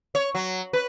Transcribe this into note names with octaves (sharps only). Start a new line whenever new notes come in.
C#5
F#3
B4